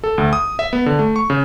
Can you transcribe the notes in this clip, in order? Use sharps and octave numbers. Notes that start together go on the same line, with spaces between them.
A4
D2
D#6
E5
B3
D3
A3
C#6
C#3